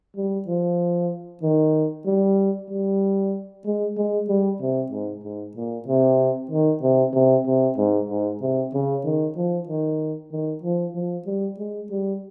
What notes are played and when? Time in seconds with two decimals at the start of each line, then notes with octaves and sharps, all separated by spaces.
0.16 G3
0.48 F3
1.43 D#3
2.06 G3
2.70 G3
3.65 G#3
3.97 G#3
4.29 G3
4.61 C3
4.91 G#2
5.24 G#2
5.56 A#2
5.88 C3
6.51 D#3
6.82 C3
7.14 C3
7.47 C3
7.77 G#2
8.10 G#2
8.41 C3
8.74 C#3
9.04 D#3
9.36 F3
9.68 D#3
10.32 D#3
10.63 F3
10.95 F3
11.26 G3
11.59 G#3
11.91 G3